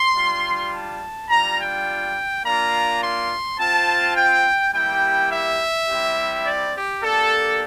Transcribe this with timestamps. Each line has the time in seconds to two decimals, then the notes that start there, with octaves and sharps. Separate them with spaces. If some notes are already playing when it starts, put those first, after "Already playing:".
Already playing: C6
0.15 G3 D4 F4
0.73 A5
1.29 G3 D4 F4 A#5
1.58 G5
2.44 A#3 D4 F4 A#5
3.02 C6
3.60 C4 F4 A5
4.16 G5
4.73 G3 A#3 E4 G4 G5
5.31 E5
5.88 G3 C4 E4 G4
6.45 D5
6.74 G4
7.03 A#3 D4 G4 A4